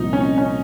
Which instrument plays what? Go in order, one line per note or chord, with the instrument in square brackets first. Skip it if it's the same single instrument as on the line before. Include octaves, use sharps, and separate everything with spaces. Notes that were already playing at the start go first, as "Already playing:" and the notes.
Already playing: [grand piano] C2 A#2 F3 C4 F4 [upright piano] D#4
[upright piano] C#4
C#4